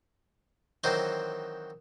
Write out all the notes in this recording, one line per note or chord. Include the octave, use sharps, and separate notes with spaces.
D#3 E3 F#3 C4 D#4 C5